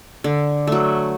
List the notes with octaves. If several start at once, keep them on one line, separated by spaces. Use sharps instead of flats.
D3
F#3 A3